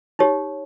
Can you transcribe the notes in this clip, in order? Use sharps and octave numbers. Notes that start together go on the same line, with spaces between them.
D#4 G4 C#5